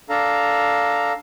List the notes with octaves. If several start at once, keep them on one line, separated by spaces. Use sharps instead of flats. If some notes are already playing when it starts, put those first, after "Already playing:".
D4 A4 F5 A#5